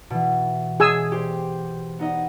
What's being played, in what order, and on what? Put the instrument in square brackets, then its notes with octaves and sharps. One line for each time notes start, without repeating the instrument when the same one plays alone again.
[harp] B2 E3
[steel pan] G#4 G#5 E6
[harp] G4 C5
B3 D#4 D#5